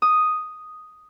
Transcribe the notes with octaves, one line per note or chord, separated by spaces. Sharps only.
D#6